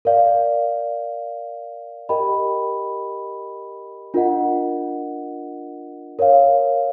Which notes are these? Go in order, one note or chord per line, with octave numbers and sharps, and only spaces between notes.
A#4 D5 F5
G4 A#4 D#5 G5 B5
D4 F4 A#4 D#5 F#5
A#4 C#5 F5